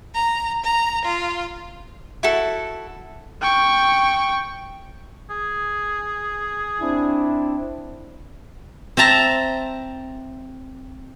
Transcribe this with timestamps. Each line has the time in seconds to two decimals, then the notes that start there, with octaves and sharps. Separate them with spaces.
0.15 A#5
0.63 A#5
1.05 F4
2.23 E4 F#4 A4
3.42 G5 C#6
5.30 G#4
6.81 C4 D4 E4
8.97 C4 E5 A5 A#5